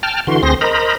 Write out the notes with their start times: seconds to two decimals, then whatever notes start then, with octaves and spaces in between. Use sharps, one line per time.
0.03 G5 A5 F6
0.27 D3 E3 F#4 C6
0.43 D2 C4 G#4 C5 C6 A#6
0.61 A#4 C5 D#5 A#5 B5